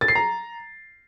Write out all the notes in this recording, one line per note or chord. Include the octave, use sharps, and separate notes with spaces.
A6
C7
A#5